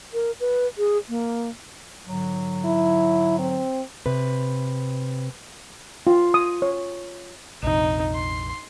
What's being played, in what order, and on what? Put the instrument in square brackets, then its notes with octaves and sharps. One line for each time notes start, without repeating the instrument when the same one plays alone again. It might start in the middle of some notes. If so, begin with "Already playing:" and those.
[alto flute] A#4
B4
G#4
A#3
[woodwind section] G#2 D3 F#3
[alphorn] E4
C4
[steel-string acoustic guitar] C3 B4
[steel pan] F4
D#6
C#5
[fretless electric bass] A#1 F2 C3 [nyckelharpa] D#4
[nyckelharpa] C6